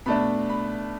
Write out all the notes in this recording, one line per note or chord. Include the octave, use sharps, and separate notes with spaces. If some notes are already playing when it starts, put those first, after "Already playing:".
B2 A3 D4 B5
B5